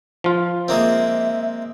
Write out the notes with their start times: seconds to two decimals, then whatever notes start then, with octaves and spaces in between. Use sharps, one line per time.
0.24 F3 F4
0.68 G#3 A#3 C4 E5